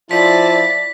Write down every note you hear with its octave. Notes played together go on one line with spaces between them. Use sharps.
F3 E4 D5 A6 B6